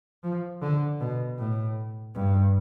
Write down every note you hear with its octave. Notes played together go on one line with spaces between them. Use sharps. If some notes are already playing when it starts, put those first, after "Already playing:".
F3
D3
B2
A2
G2